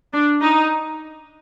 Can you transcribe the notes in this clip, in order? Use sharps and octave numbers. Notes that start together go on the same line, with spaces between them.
D4
D#4